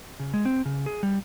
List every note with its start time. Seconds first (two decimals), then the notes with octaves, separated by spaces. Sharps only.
0.20 C#3
0.34 G#3
0.45 C4
0.66 C#3
0.86 G#4
1.03 G3